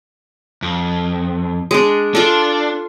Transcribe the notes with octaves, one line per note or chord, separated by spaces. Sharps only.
F2
G#3 D4
D4 F4 A4